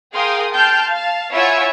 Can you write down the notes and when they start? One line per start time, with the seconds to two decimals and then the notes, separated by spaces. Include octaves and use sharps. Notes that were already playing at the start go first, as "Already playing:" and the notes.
0.14 G#4 A#4 F5 G5 C6 D#6
0.53 G5 A5 C6 F6 G6
0.90 F5 A5
1.33 E4 F4 C#5 E5 F#5 G#5